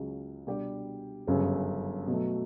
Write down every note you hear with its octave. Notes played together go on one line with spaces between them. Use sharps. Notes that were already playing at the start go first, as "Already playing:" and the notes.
Already playing: C#2 C#3 F#3
B2 G3 D4 G4
G1 F#2 C#3
B2 F#3 A3